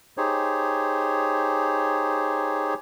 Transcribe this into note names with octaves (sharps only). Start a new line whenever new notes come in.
D#4 G4 G#4 C5 C#5